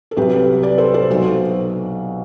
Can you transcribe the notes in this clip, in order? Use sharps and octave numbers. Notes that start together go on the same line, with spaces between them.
A4
C2 C3 F#3 G4 B4
B4 D5
A4 C5
A4 C5
B1 B2 F#3